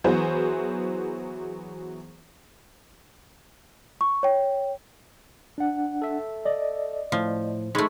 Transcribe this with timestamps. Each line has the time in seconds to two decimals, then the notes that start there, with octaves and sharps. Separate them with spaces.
0.04 E3 F#3 B3 G#4 C5
4.01 C#6
4.23 C#5 G5
5.58 D4 F#5
6.02 A4 E5
6.45 D5 D#5
7.12 A2 F3
7.75 G#3 A3 D#4 B5 C#6